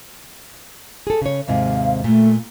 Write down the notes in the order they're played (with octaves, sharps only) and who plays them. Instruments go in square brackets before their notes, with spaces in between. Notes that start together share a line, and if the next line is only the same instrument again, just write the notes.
[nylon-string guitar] G#4 A4
C#3 C#5
[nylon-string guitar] D#2 G#2 C3 [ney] F5
[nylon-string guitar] A#2 [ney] A3